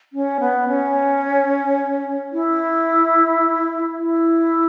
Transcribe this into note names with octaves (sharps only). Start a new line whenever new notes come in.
C#4
B3
C#4
E4
E4